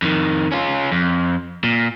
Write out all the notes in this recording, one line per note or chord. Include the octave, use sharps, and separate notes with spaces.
F2 D#3
C#4 F4
F2
A#2